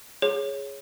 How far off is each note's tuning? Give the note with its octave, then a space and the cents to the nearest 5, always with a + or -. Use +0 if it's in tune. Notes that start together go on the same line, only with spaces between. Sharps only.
G#4 -5 C#5 +0